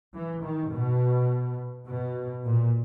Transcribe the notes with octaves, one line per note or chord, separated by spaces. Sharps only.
E3
D#3
B2
B2
A#2